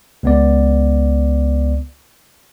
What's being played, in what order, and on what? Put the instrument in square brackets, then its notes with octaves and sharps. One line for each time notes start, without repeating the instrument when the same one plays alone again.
[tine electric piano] C#2 B3 D5